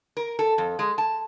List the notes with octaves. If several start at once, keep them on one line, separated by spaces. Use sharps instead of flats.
A#4
A4
F2
G#3
A5